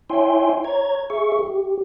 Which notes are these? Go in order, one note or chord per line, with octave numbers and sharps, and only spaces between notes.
E4 C#5 E5 G5 G#5 C6
C#5 A#5 G#6
G#4 E5 C#6
G4